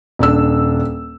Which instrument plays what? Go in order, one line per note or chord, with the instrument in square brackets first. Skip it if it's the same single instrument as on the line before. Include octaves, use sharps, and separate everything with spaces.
[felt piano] D#1 D4 E6